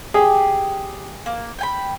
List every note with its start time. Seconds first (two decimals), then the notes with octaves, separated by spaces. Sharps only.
0.14 G4 G#4
1.26 A#3
1.59 G5 G#5 B5